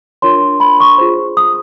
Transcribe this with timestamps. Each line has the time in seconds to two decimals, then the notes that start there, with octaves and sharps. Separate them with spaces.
0.22 D4 F4 A#4 C#5 C6
0.60 B5
0.80 C#6
0.98 F4 G#4 C5
1.37 D#6